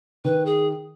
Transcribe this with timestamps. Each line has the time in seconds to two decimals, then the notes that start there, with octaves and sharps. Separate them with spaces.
0.25 D#3 B4
0.46 G#4